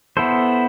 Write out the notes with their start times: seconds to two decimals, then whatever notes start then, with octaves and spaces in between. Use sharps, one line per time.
0.17 B3 E4 A4 C5